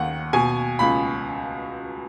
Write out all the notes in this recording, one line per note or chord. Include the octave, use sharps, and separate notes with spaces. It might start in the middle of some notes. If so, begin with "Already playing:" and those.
Already playing: D#2 D#3 F#5
B2 G#5
C#2 B5